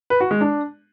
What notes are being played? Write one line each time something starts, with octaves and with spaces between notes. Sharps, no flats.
B4
F#4
G#3
D4